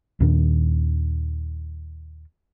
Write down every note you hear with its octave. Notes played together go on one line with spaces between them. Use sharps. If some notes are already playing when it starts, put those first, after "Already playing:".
D#2 A#2 D#3 D4